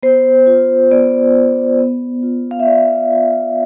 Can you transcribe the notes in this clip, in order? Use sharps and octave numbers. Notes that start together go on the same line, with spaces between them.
B3 C5
F4
B3 D5
F4
B3
F4
F5
E5
B3 D5
F4